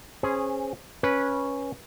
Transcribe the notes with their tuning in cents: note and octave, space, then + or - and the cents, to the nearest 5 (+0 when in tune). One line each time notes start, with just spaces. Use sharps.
C#4 -20 G#4 +0 C5 -15
C#4 +0 B4 -15